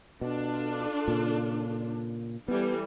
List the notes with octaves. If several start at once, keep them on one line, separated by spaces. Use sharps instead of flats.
B2 D4 F4 A4
A#2 C#3
E3 G3 B3 A4